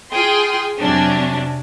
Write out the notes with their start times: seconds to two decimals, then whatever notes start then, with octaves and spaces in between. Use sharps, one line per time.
0.12 F4 G#4 G5 C6
0.79 F2 C3 F#3 C#4 D4